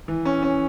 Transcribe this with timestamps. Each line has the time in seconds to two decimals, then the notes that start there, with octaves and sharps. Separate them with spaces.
0.08 E3
0.25 C#4
0.43 C#4